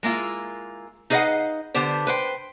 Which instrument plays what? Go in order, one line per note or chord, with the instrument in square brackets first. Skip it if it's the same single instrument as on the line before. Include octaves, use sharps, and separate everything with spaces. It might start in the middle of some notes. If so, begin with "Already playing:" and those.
[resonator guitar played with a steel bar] G#3 A#3 E4 F4
D#4 G#4 B4 D#5 F5 F#5
D3 B3 G4 C5
B4 C5 G5